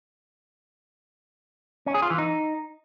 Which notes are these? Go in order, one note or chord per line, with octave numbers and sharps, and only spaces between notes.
C#4
G#4
F4
E3
D#4